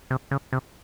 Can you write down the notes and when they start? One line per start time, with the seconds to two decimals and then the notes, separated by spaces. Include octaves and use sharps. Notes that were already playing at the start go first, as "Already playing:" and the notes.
0.10 C3
0.31 C#3
0.53 C3